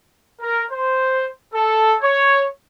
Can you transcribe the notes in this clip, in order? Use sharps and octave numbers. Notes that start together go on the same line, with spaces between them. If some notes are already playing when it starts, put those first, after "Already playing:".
A#4
C5
A4
C#5